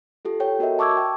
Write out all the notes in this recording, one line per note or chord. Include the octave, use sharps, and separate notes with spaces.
F4 G4 A4
A4 C#5 G5
B3 F#4 A#4 D#5 E5
A5 C#6 D6 E6 G#6
G5 D6